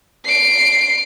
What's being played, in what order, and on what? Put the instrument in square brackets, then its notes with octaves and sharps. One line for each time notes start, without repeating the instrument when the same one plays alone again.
[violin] C7 D7